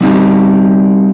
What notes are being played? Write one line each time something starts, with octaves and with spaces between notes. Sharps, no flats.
G3 C4 D#4 G4